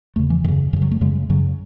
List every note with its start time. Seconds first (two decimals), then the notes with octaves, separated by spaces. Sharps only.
0.16 E2 C#3 A3
0.30 E3
0.44 F#2 D#3
0.48 C#3
0.73 F#2 E3
0.76 C#3
0.82 F#3
0.91 A3
1.01 F#2 C#3 G#3
1.29 F#2 C#3 F#3